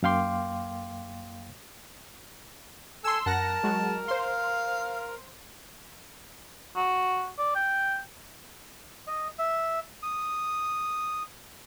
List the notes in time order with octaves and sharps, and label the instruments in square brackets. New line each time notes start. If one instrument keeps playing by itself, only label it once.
[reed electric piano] F#2 A#3 F5 G5 C6 D6
[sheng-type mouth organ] A4 G#5 [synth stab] C6 E6
[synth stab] F#2 F#5 A#6 [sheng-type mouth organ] A#4 [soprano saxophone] A5
[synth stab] F#3 G#3 F#4
[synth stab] C5 C6 [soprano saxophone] F5
[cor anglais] F#4
D5
G5
[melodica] D#5
E5
D#6